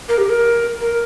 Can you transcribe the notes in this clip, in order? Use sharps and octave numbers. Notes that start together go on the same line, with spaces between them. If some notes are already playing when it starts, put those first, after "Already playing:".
A#4
G4
A#4
A#4